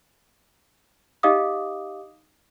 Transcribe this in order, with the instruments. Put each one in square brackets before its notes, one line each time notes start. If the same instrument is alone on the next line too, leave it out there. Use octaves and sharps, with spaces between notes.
[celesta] D#4 G4 D#5 F5 D6 D#6